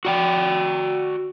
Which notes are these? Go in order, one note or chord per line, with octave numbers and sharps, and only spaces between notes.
F#4 D5 G5